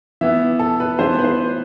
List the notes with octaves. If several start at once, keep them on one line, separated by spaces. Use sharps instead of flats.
E3 B3 E5
A4
B4
E3 B3 C5
B4
C5